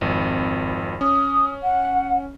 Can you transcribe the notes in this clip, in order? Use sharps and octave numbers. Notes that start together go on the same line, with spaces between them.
G#1 F2
C#4 D#6
F#5